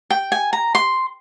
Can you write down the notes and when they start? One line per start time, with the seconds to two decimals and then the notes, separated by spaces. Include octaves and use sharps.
0.10 G5
0.32 G#5
0.53 A#5
0.75 C6